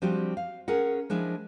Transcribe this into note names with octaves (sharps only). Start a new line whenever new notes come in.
F3 G3 C4 D4 F#4 G4
F5
C#4 G#4 A#4 F#5
F3 G#3 D4 E4